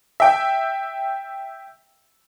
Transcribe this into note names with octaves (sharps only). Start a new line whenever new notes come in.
E5 G5